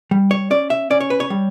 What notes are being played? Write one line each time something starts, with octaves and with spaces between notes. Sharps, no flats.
G3
C#5
C#4 D5
E5
C#4 D5
C#5
B4
C#5
G3